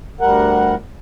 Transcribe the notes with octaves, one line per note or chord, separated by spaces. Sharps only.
D2 G3 A#4 F#5